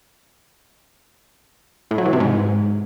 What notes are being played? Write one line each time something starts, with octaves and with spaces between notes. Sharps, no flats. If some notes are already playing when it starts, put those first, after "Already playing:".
A2
F#3
E3
C3
G#2